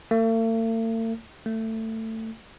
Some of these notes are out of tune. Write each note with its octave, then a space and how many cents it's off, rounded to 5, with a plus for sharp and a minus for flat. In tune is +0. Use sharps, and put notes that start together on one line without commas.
A3 +45
A3 +20